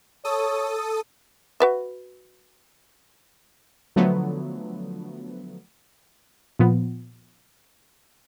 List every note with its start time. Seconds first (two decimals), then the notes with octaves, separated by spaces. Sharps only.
0.25 A4 C#5 D#6
1.60 F#4 B4 E5
3.96 D3 F3 F#3 A3 B3
6.59 A#2 F3 B3